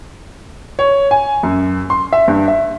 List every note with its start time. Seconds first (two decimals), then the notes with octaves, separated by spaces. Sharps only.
0.79 C#5
1.11 G#5
1.43 F#2
1.90 C6
2.13 E5
2.28 G2
2.48 E5